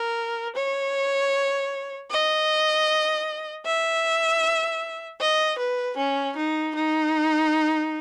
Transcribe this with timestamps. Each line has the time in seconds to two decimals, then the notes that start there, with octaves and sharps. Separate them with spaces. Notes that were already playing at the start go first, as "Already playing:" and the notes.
Already playing: A#4
0.55 C#5
2.11 D#5
3.66 E5
5.21 D#5
5.58 B4
5.97 C#4
6.36 D#4
6.75 D#4